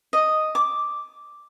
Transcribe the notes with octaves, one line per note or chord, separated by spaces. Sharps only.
D#5
D6